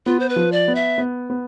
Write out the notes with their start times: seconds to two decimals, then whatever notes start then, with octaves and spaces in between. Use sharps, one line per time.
0.06 B3 F4
0.20 C5
0.29 B4
0.36 F3
0.52 D5
0.68 B3
0.75 E5
0.98 B3
1.30 B3